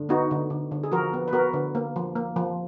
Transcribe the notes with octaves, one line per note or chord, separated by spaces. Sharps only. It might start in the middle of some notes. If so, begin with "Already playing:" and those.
Already playing: D3
B3 D#4 F#4
D3
D3
D3
G#4
F3 F#4 A#4
B3
B4
B3 F#4 A#4
D3
A#3
F3
A#3
F3